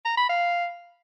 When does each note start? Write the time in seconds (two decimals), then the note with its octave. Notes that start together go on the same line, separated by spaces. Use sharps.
0.05 A#5
0.17 B5
0.29 F5